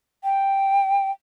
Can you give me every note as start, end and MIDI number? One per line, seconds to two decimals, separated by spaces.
0.24 1.11 79